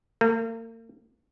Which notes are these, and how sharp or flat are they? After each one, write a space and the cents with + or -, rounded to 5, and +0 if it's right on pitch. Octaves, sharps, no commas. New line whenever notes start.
A#3 -40